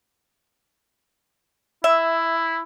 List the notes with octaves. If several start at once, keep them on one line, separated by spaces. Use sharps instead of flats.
E4 E5